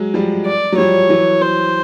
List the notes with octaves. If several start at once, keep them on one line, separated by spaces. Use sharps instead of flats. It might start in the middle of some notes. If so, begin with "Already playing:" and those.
Already playing: F#3 G#3
F3 G3
D5
F#3
F3 G3 C#5
E3 F#3
C5